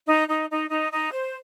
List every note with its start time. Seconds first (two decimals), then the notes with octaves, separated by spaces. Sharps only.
0.07 D#4
0.28 D#4
0.49 D#4
0.70 D#4
0.91 D#4
1.12 C5